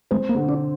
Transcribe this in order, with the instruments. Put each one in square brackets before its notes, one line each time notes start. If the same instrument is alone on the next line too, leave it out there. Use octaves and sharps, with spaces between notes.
[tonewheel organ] G#3 [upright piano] C4
[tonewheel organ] A#3
[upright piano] D3
[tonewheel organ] D4